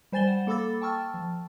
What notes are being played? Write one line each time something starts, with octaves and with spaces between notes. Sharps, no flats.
G3 C5 G#5 A6 E7 G7
F#5
A#3 A4 B5 D6 E6 A6
G5 A5 C#6 E6 F6 A6
F3